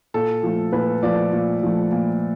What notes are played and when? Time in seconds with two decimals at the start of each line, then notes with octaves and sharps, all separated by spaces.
0.14 A#2 A4
0.43 F3 A3
0.72 A#2 B4
1.03 F3 A3 D5
1.32 A#2
1.63 F3 A3
1.92 A#2